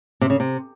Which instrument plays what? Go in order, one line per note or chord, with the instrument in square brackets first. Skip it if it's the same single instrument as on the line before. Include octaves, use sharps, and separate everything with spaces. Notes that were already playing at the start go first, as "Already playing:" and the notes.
[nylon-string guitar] C3
C#3
C3